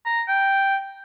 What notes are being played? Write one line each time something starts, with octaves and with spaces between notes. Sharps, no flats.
A#5
G5